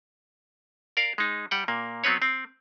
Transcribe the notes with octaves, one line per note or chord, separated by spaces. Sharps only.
A#4 D5 F5
G#3 D#4
G3 F#5 G5
A#2 A#3
F#3 B3 C4 B4 C#5
C4